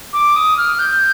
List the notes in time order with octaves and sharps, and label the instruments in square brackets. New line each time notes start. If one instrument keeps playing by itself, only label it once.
[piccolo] D6
D#6
F6
G6